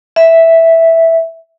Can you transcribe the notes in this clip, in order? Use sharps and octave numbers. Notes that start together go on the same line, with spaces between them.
E5